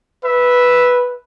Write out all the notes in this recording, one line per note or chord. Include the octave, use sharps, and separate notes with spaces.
B4 E5